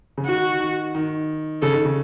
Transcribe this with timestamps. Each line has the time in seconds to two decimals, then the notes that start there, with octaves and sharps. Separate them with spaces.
0.18 C#3
0.26 D#3 F#4
0.60 D#3
0.95 D#3
1.62 C#3 A4
1.73 D#3
1.85 C#3